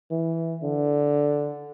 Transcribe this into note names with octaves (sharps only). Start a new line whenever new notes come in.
E3
D3